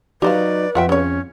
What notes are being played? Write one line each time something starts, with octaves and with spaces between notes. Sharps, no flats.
F#3 D#4 G4 B4 C5 D5 F5
F2 F4 E5 F#5 G5
C#3 C#4 C#5